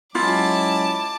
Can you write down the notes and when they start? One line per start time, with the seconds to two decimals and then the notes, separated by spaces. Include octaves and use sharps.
0.15 F#3 G#3 C#4 E4 F4 A5 D6